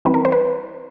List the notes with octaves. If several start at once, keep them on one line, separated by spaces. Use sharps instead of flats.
E3 G3 C4 B4
A#4
C5
B4